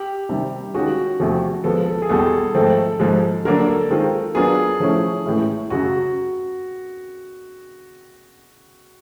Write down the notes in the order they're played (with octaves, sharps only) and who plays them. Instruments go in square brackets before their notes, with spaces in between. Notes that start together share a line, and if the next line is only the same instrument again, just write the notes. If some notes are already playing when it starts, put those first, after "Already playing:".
Already playing: [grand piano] G4
[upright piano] C3 D#3 G3
[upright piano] D#3 G#3 C#4 F4 G#4 [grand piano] F#4
[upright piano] E2 C3 F3 A3
[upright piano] F3 G#3 B3 [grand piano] A4
[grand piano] A4
G#4
[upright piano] E2 B2 G3 [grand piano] A4
[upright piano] G#2 F3 A3 C4 [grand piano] A4
[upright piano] G#2 F3 G#3
[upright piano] D3 F#3 A#3 D4 [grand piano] A#4
[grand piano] A4
[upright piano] D#3 G#3 C4 F4
[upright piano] F#3 B3 D4 F4 A#4 [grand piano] G#4
[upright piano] F3 A3 C#4 E4
A2 E3 G#3 C#4 E4
[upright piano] F#2 C#3 F#3 [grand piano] F#4